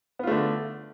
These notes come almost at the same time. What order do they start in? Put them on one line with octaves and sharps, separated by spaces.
B3 F4 A3 D3